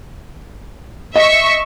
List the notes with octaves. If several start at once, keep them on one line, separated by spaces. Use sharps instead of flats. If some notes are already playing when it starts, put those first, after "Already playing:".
D#5 E5 C#6